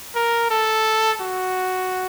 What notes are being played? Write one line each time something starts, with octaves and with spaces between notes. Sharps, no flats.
A#4
A4
F#4